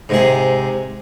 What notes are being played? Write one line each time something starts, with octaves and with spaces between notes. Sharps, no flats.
G#2 C3 G#4